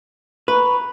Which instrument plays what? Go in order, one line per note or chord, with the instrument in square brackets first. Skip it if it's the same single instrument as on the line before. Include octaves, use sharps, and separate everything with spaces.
[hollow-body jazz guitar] B4 [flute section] A#5 B5 C#6